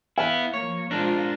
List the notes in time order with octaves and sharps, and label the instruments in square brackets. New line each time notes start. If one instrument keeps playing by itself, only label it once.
[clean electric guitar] B3 E4 [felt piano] F5
[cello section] F3 A#3 [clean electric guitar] C#5
[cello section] G#3 F4 C5 [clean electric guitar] D4 A#4